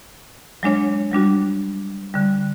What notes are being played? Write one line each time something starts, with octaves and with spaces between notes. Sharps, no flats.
F#3 G#3 D4 C#5
F#3 G3 D4 F#4
D3 G3